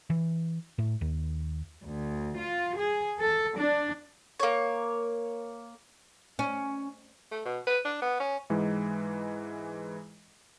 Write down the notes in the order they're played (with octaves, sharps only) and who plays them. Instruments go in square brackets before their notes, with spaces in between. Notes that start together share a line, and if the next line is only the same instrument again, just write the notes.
[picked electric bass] E3
A2
D#2
[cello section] D2
F4
G#4
A4
D4
[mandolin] A#3 C#5
[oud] C#4
[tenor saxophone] A3
B2
B4
D4
B3
C#4
[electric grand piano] G#2 E3 G#3